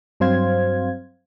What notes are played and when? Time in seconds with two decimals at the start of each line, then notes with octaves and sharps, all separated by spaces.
0.20 G2 F#3 C4 C5 F5 G#6